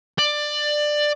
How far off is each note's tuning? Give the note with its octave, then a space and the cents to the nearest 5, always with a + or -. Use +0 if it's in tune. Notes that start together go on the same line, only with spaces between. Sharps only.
D5 +15